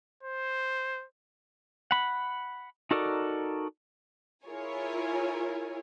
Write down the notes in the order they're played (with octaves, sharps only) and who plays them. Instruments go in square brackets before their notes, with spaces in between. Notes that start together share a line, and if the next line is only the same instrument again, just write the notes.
[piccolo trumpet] C5
[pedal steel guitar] F#5 B5
D#4 F#4 A4 A#4 D5
[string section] E4 F4 G#4 A#4 C#5 G#5